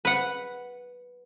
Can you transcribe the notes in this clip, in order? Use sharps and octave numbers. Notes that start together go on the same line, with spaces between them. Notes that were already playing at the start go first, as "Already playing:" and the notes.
B4 F#5